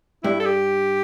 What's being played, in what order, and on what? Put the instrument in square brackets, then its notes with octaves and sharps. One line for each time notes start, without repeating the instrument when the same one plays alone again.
[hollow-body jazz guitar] G2 [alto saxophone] E4
[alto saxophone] A4
G4